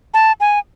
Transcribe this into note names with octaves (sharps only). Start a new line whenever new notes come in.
A5
G#5